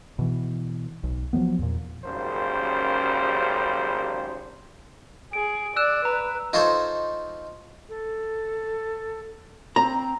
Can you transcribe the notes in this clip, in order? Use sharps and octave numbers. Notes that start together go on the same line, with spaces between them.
B2 E3
B1
F3 F#3 A3 B3
E2 A#2
G#1 F#2 C#3 G3 A#3 C5
G#4 D7
D5 E6 F#6 E7
B4 A#5
D#4 F4 A4 C5 C#5
A4
C4 A#5